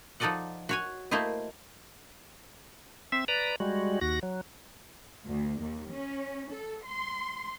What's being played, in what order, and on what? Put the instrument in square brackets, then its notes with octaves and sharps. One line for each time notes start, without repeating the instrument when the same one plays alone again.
[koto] F3 D#4 A4 D5 D#5 F#5
F#4 C#5 G#5
A3 A#3 E4 C5 D#5
[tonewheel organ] C4 E5
B4 D5 A#5
G3 G#3 F#4
D#2 F#4 A#6
F#3
[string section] D2
D#2
C#4
A4
C6